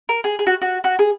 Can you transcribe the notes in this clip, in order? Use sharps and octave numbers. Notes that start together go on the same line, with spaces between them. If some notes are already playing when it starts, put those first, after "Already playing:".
A#4
G#4
G#4
F#4
F#4
F#4
G#4